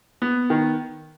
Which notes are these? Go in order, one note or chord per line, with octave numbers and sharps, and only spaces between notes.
B3
D#3